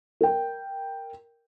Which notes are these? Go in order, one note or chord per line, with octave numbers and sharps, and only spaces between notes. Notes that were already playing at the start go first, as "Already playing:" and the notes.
A#4 G5